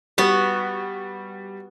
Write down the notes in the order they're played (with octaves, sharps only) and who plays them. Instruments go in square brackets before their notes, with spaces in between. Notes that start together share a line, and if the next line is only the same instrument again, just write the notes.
[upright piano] G3 [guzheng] B3 F#4